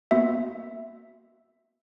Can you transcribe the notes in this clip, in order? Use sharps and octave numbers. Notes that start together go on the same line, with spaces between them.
A#3 B3 F#4 E5